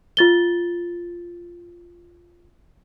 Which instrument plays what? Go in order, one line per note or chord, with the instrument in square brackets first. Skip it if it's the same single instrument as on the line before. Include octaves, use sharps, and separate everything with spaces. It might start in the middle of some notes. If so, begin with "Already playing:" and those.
[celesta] F4 A6 G7